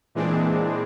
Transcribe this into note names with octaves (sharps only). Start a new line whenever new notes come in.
A#2 E3 G#3 C4 D4